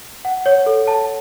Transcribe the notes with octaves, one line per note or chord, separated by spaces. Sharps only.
F#5
C#5
A4
A5